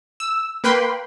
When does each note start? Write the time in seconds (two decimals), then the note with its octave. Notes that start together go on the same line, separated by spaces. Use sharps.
0.20 E6
0.64 A#3 B4 G5 B5 C6